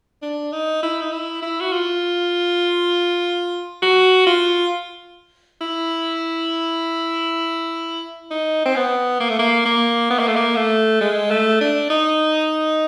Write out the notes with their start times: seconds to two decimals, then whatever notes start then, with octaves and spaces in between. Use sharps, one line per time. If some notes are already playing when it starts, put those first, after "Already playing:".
0.22 D4
0.52 D#4
0.83 E4
1.01 D#4
1.12 E4
1.42 E4
1.61 F#4
1.73 F4
3.82 F#4
4.26 F4
5.61 E4
8.31 D#4
8.65 C4
8.76 B3
9.20 A#3
9.30 A3
9.39 A#3
9.65 A#3
10.10 B3
10.19 A#3
10.28 A3
10.36 A#3
10.56 A3
11.01 G#3
11.31 A3
11.61 D4
11.90 D#4